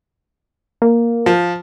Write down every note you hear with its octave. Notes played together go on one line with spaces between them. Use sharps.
A#3
F3